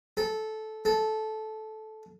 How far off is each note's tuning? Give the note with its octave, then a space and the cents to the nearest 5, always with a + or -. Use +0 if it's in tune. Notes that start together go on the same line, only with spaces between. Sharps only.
A4 -15
A4 -15